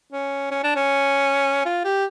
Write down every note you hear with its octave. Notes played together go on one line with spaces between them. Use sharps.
C#4
C#4
D4
C#4
F4
G4